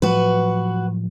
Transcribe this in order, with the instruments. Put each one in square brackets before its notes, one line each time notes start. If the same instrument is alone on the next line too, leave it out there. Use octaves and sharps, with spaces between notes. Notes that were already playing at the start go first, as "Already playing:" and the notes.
[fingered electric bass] A2 F3 F#3 [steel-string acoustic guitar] F#4 B4